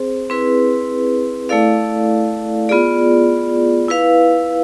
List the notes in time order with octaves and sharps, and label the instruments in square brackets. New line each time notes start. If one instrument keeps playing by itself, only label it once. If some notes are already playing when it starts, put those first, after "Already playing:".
Already playing: [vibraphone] C4 G#4 C5
C4 E4 G#4 B4
A3 E4 A4 D5 F5
B3 F4 G#4 D5
E4 B4 F5